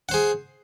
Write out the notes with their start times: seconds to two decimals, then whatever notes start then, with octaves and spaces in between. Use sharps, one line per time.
0.09 F#5
0.11 C5
0.14 G#4